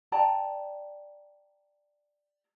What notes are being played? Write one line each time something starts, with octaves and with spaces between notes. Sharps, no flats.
D5 G5 A5 A#5